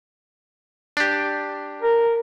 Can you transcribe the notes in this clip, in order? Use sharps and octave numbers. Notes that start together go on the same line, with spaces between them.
D4 G4
A#4